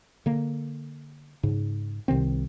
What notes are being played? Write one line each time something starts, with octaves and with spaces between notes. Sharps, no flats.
D3 A#3
G#2 C#3
C2 C3 D#3 C4